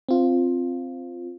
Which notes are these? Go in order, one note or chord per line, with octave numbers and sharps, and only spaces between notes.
C4 F4